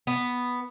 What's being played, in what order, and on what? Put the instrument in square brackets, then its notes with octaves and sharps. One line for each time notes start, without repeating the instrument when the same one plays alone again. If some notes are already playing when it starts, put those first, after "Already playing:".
[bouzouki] B3